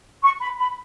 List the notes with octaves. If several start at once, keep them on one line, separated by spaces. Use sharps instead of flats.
C#6
B5
B5